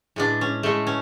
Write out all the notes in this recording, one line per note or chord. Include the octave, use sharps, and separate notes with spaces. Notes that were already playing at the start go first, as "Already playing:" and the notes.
A2 G#3 D4
C#4
A2 G#3 A3
C#4